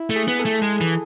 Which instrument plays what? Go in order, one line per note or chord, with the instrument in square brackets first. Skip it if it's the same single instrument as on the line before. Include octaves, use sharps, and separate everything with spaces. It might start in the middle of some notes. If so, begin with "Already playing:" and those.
Already playing: [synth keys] E4
[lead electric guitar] A3
[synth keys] G#4
[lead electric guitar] B3
[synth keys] A4
[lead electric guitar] A3
[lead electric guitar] G#3 [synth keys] G#4
[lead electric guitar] E3